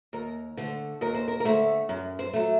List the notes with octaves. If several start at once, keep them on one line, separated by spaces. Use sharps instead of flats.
D#2 A#4
D3 A3 C5
D#2 A#4
C5
A#4
A#4
D3 A3 C5
F#2
C5
F#3 A3